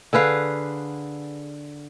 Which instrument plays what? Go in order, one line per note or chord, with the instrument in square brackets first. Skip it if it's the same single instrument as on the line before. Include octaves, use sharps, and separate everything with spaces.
[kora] D3 G#4 B4 F5